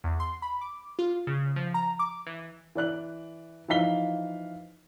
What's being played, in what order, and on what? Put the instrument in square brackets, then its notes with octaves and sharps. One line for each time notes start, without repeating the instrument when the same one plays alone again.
[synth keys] E2
C6
B5
D6
F4
C#3
F3
A#5
D6
E3
[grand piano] E3 D5 F#6 F#7
E3 F3 D#4 F5 B6 G7